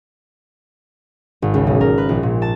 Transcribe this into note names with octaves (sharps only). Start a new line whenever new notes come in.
G#1
C#2
B1
A#4
B4
A#1
A#2
A5